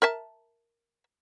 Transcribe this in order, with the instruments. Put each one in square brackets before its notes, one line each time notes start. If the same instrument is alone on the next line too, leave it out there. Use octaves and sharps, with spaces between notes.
[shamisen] A#4 E5 A5